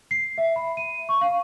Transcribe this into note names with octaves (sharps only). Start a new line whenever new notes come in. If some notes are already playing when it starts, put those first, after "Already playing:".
C7
E5
B5
D#7
C#6
F5